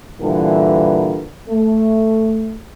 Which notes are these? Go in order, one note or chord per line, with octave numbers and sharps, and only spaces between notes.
G2 A#2 D3 E3
A3